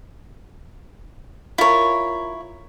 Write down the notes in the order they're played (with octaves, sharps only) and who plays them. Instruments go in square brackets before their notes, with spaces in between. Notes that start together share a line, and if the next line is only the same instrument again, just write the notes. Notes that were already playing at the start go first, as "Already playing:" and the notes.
[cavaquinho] E4 C#5 [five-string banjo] F4 A#4